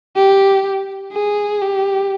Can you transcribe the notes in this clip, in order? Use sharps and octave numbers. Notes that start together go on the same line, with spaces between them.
G4
G#4
G4